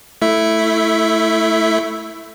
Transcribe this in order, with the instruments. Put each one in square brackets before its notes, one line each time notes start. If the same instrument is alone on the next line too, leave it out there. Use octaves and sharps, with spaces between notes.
[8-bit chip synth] A3 E4 E5